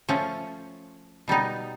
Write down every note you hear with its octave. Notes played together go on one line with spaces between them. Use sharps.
F3 A3 C#4
B2 G3 B3 D#4